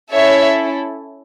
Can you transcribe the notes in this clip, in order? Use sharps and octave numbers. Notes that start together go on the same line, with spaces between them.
C#4 E4 A4 C#5 E5